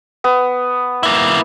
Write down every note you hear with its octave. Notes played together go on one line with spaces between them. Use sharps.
B3
A#3 E4